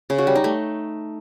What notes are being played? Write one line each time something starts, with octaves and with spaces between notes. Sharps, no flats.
C#3
F#4
G3
D#4
A3